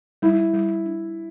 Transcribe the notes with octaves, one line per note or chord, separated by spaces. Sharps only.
G3 E4
G3
D4